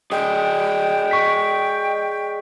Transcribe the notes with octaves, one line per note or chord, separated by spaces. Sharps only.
G#4 D5 D#5 G5
C#6 B6